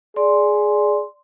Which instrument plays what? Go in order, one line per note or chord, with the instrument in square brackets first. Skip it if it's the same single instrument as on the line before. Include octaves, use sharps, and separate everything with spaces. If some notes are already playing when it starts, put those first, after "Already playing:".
[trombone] G#4 [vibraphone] D5 C6